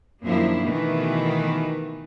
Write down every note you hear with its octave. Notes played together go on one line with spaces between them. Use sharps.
F#2 D#3 F3 A#3 D4 E4
B2 D#3 E3 A3